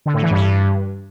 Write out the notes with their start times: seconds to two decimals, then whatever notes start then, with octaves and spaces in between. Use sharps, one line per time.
0.06 D3
0.14 A2
0.22 E3
0.31 G2